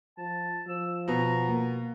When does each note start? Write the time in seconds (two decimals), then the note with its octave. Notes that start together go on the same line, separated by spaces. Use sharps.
0.18 F3 A5
0.68 F3 E6
1.08 B2 B3 A#5
1.49 A#3